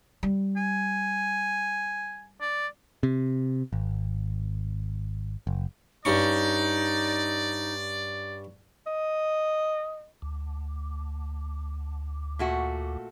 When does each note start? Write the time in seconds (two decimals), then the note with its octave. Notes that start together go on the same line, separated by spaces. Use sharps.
0.23 G3
0.57 G#5
2.41 D5
3.03 C3
3.73 G#1
5.47 F#1
6.05 G2 C#4 D#4 D5 C#6
8.87 D#5
10.22 D2
12.39 A#2 A3 F#4